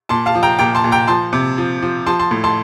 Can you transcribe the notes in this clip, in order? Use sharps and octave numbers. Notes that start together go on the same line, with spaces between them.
A#2 A5 C6
F5 A5
F3
G5 A#5
A#2 G5 A#5
A5 C6
A#2
G5 A#5
F3 A5 C6
C3
F3
F3
F3 A5 C6
A5 C6
A2
A5 C6